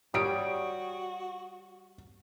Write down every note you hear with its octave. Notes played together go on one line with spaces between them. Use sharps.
G3 F#4 G4 C#5 D#6 D7